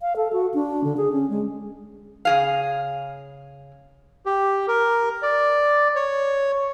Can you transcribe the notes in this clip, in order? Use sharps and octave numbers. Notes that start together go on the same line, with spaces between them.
F5
A4
F#4
D4
D3
G#4
C#4
G#3
C#3 G#4 F5
G4
A#4
D5
C#5